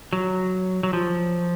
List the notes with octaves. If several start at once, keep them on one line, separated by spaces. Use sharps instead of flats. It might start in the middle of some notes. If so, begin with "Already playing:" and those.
F#3
F#3
F3